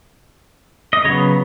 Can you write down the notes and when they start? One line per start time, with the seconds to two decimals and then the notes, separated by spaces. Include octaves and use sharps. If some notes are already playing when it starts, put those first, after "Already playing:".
0.93 D#5
1.04 C#3 F#3 B3 C#5